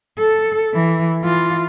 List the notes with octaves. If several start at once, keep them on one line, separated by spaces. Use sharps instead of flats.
A4
E3
E3 F4